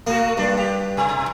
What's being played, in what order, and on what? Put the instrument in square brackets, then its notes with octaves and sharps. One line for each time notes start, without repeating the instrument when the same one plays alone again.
[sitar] A3 F#4 [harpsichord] A#3
[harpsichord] G2 [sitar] D4
[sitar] G4
B2